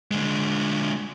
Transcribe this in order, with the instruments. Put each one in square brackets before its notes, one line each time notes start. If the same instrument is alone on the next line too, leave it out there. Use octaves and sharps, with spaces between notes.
[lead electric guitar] D3 G#3